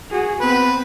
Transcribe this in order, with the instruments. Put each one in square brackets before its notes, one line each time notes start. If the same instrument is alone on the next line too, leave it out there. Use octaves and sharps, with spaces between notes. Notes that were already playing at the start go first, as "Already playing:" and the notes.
[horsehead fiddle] F#4 G#4
[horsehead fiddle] B3 C4 [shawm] B4